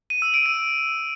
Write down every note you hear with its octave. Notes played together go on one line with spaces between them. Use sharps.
D#7
E6
D7
D#7